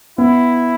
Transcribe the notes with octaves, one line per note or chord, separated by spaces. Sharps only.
B3 E4